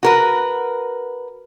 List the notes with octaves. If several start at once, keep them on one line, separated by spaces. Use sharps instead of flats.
F#4 A#4 B4